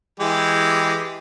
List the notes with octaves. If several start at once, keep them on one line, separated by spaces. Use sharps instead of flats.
E3 G#3 G4